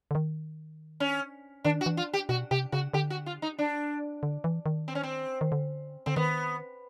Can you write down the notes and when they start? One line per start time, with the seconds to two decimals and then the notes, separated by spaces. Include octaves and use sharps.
0.11 D3
0.15 D#3
1.00 C#4
1.64 D#3 D4
1.81 F#4
1.86 E3
1.97 F4
2.13 G4
2.29 B2 F#4
2.51 C3 G4
2.72 C#3 F#4
2.93 D3 G4
3.10 F#4
3.26 F4
3.42 D#4
3.59 D4
4.23 D3
4.44 E3
4.66 D#3
4.88 C4
4.95 C#4
5.03 C4
5.41 D#3
5.52 D3
6.06 D3 C4
6.16 D#3 B3